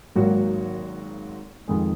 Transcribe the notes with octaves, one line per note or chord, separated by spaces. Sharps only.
G#1 G#2 D#3 F#3 A#3 F#4
F2 D#3 G#3